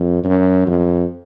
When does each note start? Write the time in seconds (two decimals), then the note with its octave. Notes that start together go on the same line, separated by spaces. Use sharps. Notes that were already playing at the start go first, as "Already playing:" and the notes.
Already playing: F2
0.24 F#2
0.67 F2